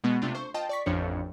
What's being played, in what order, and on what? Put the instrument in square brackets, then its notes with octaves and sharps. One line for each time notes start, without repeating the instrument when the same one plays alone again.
[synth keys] B2 G#3 B3
C3 A3 D4 F4
C5 C#6
F4 D#5 G5 A5
D5 C#6 B6
A1 F2 F3 D4 C#5 C#7